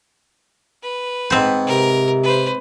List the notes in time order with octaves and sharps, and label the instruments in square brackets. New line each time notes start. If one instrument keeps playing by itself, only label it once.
[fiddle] B4
[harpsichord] G#2 B3 [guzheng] C4 C5
[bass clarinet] C3 [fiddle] A#4
[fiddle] B4 C5